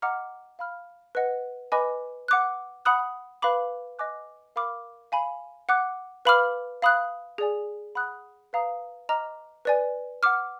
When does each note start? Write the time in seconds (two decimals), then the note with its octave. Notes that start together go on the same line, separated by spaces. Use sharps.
0.02 D#5 F#5 A#5 D6 F6
0.59 F5 B5 F6
1.15 B4 D#5 F#5
1.72 B4 D#5 G#5 B5 D6
2.28 F#5 D6 F#6
2.85 F#5 B5 D#6 F#6
3.42 B4 F5 B5 D6
3.99 D#5 G#5 D6 F#6
4.56 A#4 F5 B5 D6 F6
5.12 F5 G#5 B5
5.69 F#5 D6 F#6
6.25 B4 F5 B5 D6 F6
6.82 F5 B5 D#6 F#6
7.38 G#4 D5 G#5
7.95 F#5 B5 D#6 F#6
8.53 B4 F5 A#5 D#6
9.09 D#5 A#5 D6 F6
9.65 B4 D5 G#5
10.23 F#5 D6 F6